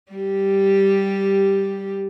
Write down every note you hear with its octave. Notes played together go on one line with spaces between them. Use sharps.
G3 G4